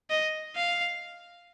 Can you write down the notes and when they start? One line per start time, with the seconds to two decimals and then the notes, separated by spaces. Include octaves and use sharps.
0.10 D#5
0.56 F5